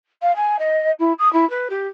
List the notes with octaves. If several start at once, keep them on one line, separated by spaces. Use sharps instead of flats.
F5
G#5
D#5
E4
D#6
E4
B4
G4